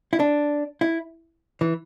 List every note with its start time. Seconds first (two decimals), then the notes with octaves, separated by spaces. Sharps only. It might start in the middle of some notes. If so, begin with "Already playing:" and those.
0.13 E4
0.20 D4
0.81 E4
1.61 E3